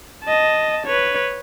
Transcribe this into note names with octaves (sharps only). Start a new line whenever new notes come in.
D#5 A5
B4 C#5